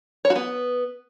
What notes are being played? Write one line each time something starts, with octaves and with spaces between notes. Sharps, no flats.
C#5
F#4
B3